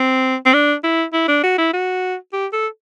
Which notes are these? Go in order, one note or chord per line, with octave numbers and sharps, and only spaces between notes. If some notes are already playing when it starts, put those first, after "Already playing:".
Already playing: C4
C4
D4
E4
E4
D4
F#4
E4
F#4
G4
A4